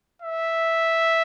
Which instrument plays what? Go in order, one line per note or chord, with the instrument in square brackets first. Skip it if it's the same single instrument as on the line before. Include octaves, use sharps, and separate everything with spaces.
[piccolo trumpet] E5